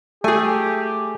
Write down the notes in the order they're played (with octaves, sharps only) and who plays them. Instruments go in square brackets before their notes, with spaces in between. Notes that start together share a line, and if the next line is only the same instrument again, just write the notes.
[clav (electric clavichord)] A3 [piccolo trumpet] G4 [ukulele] G#4 G#5